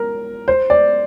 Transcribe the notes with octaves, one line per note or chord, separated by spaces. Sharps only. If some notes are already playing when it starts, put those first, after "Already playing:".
Already playing: A#4
C5
D5